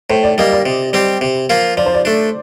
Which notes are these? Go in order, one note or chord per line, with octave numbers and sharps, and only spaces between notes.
A2 C5
D5
G3 A#3 D#5
D5
C3
G3 C4 G4
C3
F3 A#3 F4
F3 D5
C5
D5
A3 D4